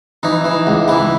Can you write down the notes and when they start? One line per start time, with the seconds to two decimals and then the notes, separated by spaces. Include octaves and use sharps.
0.23 E3 D#4
0.44 E3
0.67 C#2
0.88 E3 E4